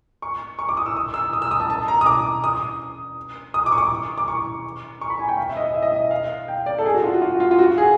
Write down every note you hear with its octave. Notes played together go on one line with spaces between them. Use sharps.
C#6
C#6
D6
D#6
E6
D#6
E6
D#6
E6
D#6
A5
A5
A#5
D#6
D6
D#6
D#6
D6
C#6
D6
D6
C#6
C#6
B5
G#5
G5
F5
E5
D#5
E5
D#5
E5
F5
G5
D5
A4
G#4
F#4
F4
F#4
F4
F4
F4
F#4
G#4